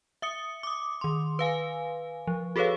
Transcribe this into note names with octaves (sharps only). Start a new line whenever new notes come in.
E5 D#6 C#7
D6 D#6
D#3 C6
B4 F5 G#5
F3
F#4 G#4 A4 B4 C#5 F5